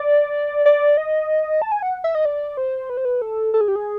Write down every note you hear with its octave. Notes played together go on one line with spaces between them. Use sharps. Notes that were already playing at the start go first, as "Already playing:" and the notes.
Already playing: D5
D5
D#5
A5
G#5
F#5
E5
D#5
D5
C5
B4
C5
B4
A4
A4
G#4
G4
G#4